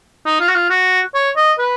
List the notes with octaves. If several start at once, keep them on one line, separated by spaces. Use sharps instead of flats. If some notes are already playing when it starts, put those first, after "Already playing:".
D#4
F4
F#4
F4
F#4
C#5
D#5
B4